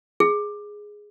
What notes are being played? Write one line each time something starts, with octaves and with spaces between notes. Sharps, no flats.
G#4